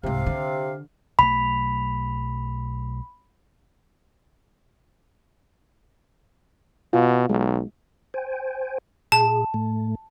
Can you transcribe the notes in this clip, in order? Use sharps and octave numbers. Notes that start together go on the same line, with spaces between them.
C2 G#2 C3 F5
D3
B1 F#3 A3 B5
B2 F4
B1 G#3
C5 G5 G#5
A#2 G#4 A5
A2 A3